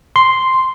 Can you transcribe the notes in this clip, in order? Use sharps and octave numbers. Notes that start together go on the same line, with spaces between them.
C6